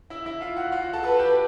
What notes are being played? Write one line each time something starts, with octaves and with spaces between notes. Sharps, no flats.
E4 E5
E4 E5
F4 F5
F#4 F#5
F4 F5
F#4 F#5
A4 A5
A4 B4 A5
G4 G5